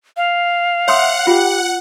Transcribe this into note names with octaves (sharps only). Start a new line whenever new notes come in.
F5
C#5 E5 F#5 C6 D#6
F4 G4